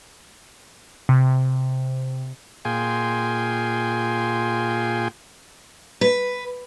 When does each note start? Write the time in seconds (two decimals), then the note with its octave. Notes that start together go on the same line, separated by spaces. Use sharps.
1.09 C3
2.65 A#2 F4 G#4 G5 G#5 C6
6.01 B4